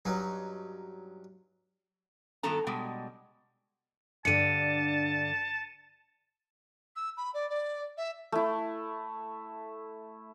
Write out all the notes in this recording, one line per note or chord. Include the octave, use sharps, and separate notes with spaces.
G2 F#3 C#4 D#4
G2 D#3 F#3 B3 A4 A#5
B2 G3 G#3
G2 D3 A5 C#7 D#7
E6
B5
D5
D5
E5
A3 E4